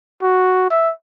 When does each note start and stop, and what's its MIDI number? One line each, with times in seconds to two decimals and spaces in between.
0.22 0.68 66
0.70 0.91 76